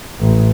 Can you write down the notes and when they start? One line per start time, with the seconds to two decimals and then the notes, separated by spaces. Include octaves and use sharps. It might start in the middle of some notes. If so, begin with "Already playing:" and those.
0.20 A1